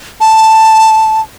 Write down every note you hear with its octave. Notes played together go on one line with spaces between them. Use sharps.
A5